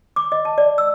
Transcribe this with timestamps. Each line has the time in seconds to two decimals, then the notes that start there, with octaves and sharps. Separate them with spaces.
0.16 D6
0.32 D#5
0.45 A5
0.58 D5
0.78 E6